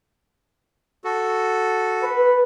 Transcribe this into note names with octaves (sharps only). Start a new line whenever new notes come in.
F#4 A4
B4